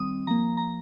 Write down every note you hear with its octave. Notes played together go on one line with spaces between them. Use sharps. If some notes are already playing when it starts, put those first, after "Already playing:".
Already playing: D#3 G3 C4 D#6
F3 A#3 A#5
A#5